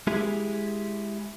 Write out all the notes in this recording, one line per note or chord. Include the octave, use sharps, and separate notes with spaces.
G#3 E4 G4 G#4